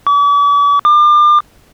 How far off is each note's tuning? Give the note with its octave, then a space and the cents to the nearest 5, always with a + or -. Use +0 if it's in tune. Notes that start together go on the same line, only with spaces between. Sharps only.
D6 -45
D6 +35